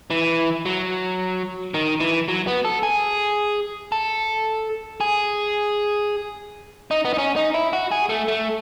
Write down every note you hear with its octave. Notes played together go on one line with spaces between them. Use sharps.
E3
F#3
D#3
E3
F#3
B3
A4
G#4
A4
G#4
D#4
B3
D#4
C#4
D#4
E4
F#4
G#4
A3
A3